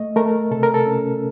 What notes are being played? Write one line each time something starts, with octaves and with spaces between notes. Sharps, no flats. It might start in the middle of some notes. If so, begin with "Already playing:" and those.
Already playing: A3 D#5
A3 A#4
C3 A4
A#4
A4
C#4